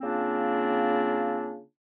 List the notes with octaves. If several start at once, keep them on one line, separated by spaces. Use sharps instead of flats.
C#3 A#3 C4 D4 F4